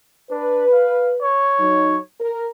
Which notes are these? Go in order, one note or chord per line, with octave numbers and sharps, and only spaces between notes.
D4 B4
F5
C#5
F#3 D#4
A#4